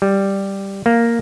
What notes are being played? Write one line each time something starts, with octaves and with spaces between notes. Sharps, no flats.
G3
A#3